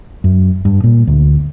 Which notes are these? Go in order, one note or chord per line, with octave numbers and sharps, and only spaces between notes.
F#2
G2
A#2
D2